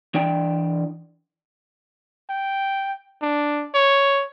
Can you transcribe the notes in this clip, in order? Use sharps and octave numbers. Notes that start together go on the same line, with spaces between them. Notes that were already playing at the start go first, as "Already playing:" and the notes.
E3 D4 D5 G5
G5
D4
C#5